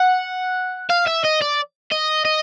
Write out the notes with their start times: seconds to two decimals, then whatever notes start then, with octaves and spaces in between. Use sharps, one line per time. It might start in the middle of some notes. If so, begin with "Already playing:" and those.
Already playing: F#5
0.89 F5
1.07 E5
1.24 D#5
1.41 D5
1.91 D#5
2.25 D#5